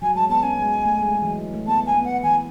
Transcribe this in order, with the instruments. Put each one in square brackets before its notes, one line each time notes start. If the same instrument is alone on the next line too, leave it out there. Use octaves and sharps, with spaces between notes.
[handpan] F#3 [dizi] G#5
[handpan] G#3 [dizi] A5
[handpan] B3 [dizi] A5
[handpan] C#4 [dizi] G#5
[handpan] G#3
A3
G#3
G#3
E3
F#3
A3
[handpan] B3 [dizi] A5
[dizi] G#5
[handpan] B3
[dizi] F#5
[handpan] E3 [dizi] G#5